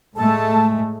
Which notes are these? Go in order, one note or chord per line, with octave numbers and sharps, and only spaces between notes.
A2 G#3 A3 A4 A5